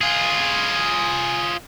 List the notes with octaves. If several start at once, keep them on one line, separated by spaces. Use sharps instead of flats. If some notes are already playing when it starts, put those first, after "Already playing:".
F4 G#4